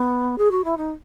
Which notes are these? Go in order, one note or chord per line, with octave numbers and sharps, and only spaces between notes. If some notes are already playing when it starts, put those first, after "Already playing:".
Already playing: B3
G#4
F#4
E4
D#4